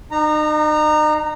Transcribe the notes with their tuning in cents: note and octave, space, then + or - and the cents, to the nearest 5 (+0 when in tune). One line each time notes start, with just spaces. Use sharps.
D#4 -40 A#5 -10